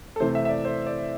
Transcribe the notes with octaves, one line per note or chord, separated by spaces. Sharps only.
A4
C3 E3 A3 C5
E5
E5
D5
C5
D5